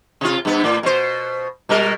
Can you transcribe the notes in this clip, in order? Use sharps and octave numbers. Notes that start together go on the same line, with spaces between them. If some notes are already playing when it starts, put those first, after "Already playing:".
C3 F4
G2 B3
A2
B2 C5
B2 G3 A#4